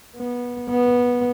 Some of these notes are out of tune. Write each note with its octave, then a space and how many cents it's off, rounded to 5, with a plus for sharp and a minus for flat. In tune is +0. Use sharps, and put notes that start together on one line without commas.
B3 -20
B3 -15